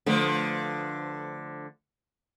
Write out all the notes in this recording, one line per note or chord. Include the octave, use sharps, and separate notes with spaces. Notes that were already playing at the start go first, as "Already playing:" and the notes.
D3 F3 A3 B4 C5